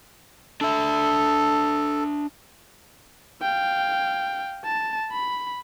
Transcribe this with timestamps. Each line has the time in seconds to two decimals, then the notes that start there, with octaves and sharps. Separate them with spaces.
0.61 D4 A4 E5
3.42 F5 G5
4.65 A5
5.12 B5